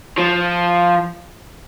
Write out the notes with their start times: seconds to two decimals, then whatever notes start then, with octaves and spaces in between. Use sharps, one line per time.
0.18 F3